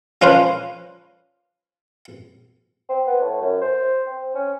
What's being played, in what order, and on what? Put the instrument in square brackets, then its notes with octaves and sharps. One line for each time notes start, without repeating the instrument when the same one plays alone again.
[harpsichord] F3 C#4 D4 F4 B4 C5
[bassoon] C4
B3
A2
F#2
C5
C4
C#4